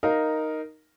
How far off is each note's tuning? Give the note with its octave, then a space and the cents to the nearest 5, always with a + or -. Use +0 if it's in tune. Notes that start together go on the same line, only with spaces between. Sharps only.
D#4 +0 A#4 +0 F5 +0